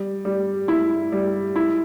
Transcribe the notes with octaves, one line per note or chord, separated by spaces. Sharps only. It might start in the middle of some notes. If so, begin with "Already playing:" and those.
Already playing: G3
G3
E4
G3
E4